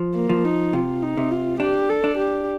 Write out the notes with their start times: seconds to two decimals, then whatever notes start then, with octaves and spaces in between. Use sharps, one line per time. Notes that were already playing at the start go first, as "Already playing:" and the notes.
Already playing: F3
0.15 A#3
0.29 F3
0.45 D#4
0.73 C3 F4
1.03 D#4
1.17 C3
1.31 F4
1.60 D4 G4
1.89 A4
2.04 D4
2.18 G4